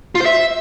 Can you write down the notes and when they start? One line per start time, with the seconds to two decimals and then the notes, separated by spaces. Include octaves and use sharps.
0.15 F4
0.20 C5
0.26 E5